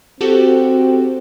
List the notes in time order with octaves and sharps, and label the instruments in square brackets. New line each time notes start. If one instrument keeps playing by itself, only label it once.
[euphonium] C4 [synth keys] F#4 G4 A4